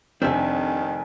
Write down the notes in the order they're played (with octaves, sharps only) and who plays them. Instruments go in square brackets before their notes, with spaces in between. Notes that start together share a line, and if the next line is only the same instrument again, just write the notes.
[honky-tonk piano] F1 G#5 [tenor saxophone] D#3 [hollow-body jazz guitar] C4 E5 [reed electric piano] D4